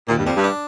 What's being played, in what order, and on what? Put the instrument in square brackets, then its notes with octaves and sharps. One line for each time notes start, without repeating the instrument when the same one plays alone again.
[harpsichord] D#2 [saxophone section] A#2
[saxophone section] G2
[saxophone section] F2 [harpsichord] G3
[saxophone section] G2
[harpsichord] D4